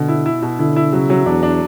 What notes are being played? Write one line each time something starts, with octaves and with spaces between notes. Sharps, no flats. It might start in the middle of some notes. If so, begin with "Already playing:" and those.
Already playing: B2 D3
E4
E4
B2
D3 E4
E4
C#3 F#3
F#3
E2 D4
D4